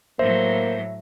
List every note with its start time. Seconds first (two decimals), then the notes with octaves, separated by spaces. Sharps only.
0.19 A2 F#3 A#3 C5 E5